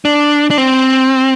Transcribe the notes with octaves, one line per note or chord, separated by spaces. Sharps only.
D4
D4
C4